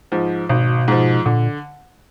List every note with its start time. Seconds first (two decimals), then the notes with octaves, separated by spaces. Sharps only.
0.12 G#2 F3
0.49 G#1 B2
0.88 G#2 F3
1.26 A#2 D3